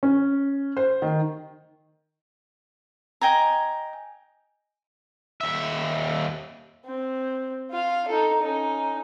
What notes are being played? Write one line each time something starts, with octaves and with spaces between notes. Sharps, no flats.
C#4
C5
D#3
D#5 G5 G#5 A#5
D#2 E5
C4
F4 F5
D#4 A4
C#4 D#4